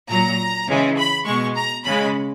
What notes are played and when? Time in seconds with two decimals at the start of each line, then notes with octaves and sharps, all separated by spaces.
0.09 A#2 F#3 A#5
0.68 C#3 E3 G#3
0.98 B5
1.26 B2 G#3 C#6
1.56 A#5
1.85 C#3 G#3 B5